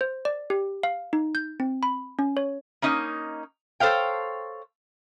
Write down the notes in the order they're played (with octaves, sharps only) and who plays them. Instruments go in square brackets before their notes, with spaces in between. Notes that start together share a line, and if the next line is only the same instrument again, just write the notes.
[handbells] C5
D5
G4
F5
D#4
G6
C4
B5
C#4
C#5
[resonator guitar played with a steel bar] A#3 C#4 D#4 D#5
A4 C5 C#5 F5 G5